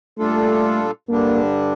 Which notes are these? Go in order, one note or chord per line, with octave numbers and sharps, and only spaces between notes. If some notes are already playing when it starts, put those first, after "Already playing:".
A#2 G3 A3 D4 F4 A4
G2 D3 G3 A#3 D4